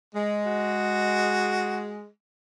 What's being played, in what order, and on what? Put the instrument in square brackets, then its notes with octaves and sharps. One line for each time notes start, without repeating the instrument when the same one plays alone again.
[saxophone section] G#3
[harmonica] F#4